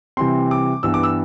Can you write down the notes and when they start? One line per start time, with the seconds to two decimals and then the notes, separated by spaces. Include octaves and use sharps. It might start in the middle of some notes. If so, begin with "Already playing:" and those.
0.17 C3 E3 G3 C4 C6
0.51 D6
0.83 G2 E3 G3 B3 E6
0.94 D6
1.03 E6